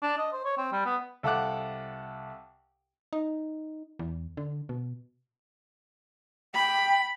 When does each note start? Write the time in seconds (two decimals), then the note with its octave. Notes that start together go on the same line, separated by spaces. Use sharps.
0.02 D4
0.18 D#5
0.32 C5
0.44 C#5
0.57 C4
0.72 G3
0.85 B3
1.23 C2 A4 F5 F#5 D6 F#6
3.13 D#4
3.99 E2
4.37 D3
4.69 B2
6.55 G5 B5